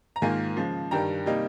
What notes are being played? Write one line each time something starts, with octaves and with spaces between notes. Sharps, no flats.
A#5
G#2 D#3 A#3 F4 F5 G#5
C#3 F3 G#3
G2 D#3 G3 G5 A#5
C3 G3 A#3 D#4